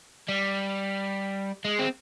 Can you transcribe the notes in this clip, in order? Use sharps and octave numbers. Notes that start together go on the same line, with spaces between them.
G3
G#3
C4